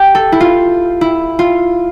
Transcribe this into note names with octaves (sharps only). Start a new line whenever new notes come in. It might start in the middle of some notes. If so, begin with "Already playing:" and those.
Already playing: G4
A4
E4
F4
E4
F4